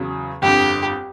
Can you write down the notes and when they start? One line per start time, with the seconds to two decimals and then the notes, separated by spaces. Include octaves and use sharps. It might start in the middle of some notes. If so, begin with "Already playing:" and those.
Already playing: E2 C#3 F#3
0.42 G1 F2 D3 G4